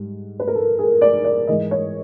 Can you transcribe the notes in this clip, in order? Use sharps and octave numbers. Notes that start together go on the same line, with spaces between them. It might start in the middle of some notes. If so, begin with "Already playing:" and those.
Already playing: G#2 G3
B4
A#4
A4
G#4
D5
D5
G#2 E3 G#3 D#5
C#5